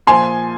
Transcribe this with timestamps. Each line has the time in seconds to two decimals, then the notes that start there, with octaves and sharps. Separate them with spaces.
0.07 A#2 F3 G#5 C6